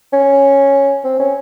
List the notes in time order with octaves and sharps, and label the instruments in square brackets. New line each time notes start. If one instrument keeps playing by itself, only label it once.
[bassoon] C#4
C4
C#4